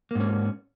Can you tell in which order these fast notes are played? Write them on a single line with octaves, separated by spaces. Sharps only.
A#3 G#2 C#4